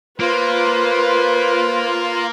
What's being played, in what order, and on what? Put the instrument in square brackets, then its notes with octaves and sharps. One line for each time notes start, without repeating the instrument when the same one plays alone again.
[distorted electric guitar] A#3 [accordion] F4 [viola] B4 [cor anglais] C5